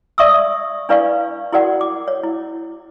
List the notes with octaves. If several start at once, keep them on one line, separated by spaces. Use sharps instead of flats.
D5 E5 C#6 D#6 E6
D4 E4 B4 D5 F5 C#6
E4 F#4 A#4 D5 F#5
D6
C#5
E4